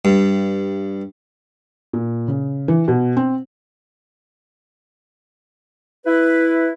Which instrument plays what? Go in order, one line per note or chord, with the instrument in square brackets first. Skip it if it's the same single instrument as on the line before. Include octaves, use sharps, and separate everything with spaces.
[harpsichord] G2
[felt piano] A#2
C#3
E3
B2
C4
[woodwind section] E4 B4